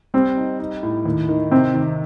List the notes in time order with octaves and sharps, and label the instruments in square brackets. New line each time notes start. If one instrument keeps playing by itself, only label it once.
[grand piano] G3 [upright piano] C4
[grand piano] D#4
D#4
A2
D#2
D#3
[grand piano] C3 [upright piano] C4
[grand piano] D#3